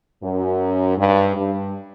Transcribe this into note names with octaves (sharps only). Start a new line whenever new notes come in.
F#2
G2
G2